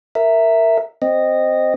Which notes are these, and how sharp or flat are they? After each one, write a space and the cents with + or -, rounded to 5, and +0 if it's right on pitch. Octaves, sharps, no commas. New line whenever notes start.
A#4 -10 E5 +0
C4 +0 D#5 -10